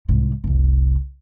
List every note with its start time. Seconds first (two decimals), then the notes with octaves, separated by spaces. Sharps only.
0.08 C2 G#2
0.44 F1 C2